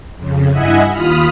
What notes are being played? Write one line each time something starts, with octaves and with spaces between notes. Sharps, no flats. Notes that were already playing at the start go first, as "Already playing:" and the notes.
F2 C#3
G2 E4 D#5 E5 F#5 G#5
D#2 F4 B5 D#6 F6